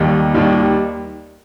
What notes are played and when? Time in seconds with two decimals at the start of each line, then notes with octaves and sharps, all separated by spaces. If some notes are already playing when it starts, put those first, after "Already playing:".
Already playing: D#2 D#3 G3 D#4
0.34 D#2 D#3 G3